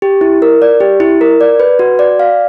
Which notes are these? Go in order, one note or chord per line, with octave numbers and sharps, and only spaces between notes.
G4
E4
A#4
D5
G4
E4
A#4
D5
B4
F#4
D5
F5